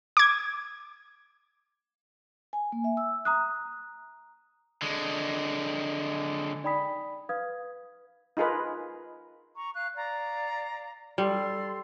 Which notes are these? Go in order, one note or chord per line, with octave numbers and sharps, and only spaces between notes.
D6 G#6
G#5
A#3
E5
E6
A#5 D#6 F#6
D3 G#3
D#4 D5 G5 B5 D#6 B6
B4 F5 D#6 G#6
D#4 F4 G#4 A#4 B4
A#5 C#6
F5 F#6
D5 F5 A#5
G3 A4 C6